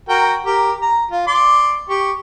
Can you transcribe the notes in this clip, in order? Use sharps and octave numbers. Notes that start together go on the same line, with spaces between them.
F#4 A#4 G5
G4 A#4
A#5
F4
D5 C6 D6
G4 C#6